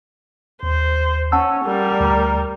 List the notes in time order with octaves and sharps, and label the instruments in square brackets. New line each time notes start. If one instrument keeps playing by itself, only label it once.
[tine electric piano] D#2 [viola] C5
[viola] C#4 [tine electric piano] F#5 A5 E6
[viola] G3 A#4
[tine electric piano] D2 A#5